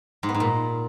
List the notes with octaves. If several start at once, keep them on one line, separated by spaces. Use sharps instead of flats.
G#2
B3
G#2
A#2